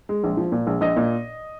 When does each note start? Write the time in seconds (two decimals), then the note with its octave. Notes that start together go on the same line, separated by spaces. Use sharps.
0.09 G#3
0.24 A#1
0.37 F3
0.52 A#2
0.67 A#1
0.81 A#1 D#5
0.97 A#2